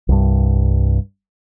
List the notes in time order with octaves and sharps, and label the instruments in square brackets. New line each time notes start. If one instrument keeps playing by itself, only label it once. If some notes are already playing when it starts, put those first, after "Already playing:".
[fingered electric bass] C2 G2